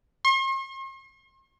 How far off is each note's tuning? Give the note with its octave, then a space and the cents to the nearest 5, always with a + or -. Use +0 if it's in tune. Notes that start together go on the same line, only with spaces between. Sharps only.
C6 +45